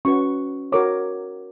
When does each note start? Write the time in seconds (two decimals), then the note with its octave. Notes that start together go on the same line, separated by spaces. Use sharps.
0.05 C#4 F#4 B4 C#6
0.72 F#4 A#4 C#5 D6